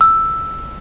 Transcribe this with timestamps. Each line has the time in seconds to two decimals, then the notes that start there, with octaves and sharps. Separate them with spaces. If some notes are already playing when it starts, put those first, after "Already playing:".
0.01 E6